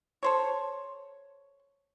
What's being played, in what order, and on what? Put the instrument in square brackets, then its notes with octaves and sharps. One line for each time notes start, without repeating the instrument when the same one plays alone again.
[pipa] A4 C5 C#5